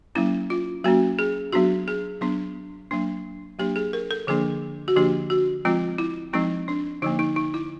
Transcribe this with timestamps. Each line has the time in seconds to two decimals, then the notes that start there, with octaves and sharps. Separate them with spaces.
0.15 F#3 A#3 C#4 E4
0.50 F4
0.84 F#3 A#3 C#4 F#4
1.19 G#4
1.53 F#3 B3 D4 F#4
1.88 G#4
2.21 F#3 B3 D4
2.91 F#3 A#3 D4
3.59 F#3 A#3 D4 G4
3.76 G#4
3.93 A#4
4.11 A4
4.27 D3 F3 A#3 D4 G#4
4.88 F#4
4.96 D3 F3 A#3 D4 G4
5.30 F#4
5.65 F3 G#3 C4 F4
5.98 E4
6.33 F3 G#3 C4 D#4
6.68 D4
7.02 D3 F3 A#3 D#4
7.19 D#4
7.36 D#4
7.54 E4